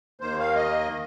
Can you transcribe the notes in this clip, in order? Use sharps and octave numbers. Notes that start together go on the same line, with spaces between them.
D#2 D#3 A#3 C5
F5
D#5